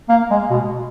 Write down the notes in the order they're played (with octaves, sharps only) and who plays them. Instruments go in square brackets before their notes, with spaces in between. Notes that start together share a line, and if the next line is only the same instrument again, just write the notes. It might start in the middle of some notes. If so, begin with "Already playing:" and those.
[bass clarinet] A#3
G#3
B2